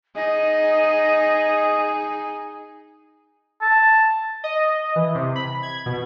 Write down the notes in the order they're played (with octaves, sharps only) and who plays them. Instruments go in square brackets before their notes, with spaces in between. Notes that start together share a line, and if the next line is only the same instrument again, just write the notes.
[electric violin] D#4 G#4 [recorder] D#5
[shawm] A5
[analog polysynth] D#5
E3
C3
B5
G#6
B2